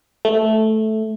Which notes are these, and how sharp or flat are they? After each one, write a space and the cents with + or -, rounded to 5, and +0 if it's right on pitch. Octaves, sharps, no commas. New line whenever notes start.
A3 -10